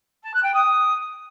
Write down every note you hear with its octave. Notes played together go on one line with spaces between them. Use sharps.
A5
F#6
G5
D#6